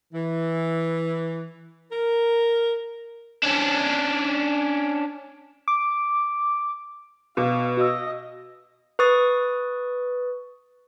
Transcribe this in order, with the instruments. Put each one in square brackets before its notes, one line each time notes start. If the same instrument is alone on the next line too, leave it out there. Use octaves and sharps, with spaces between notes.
[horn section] E3
A#4
[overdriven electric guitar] C#4 D4
[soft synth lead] D6
[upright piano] B2 [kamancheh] F5 [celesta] D6
[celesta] F#4 F5 E6 [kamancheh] D#5
[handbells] B4 C#6 D#6 A6